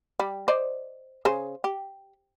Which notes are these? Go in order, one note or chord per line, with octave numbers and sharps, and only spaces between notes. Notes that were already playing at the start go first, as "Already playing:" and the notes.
G3
C5 D5 D#5
C#3 G#4 C5
G4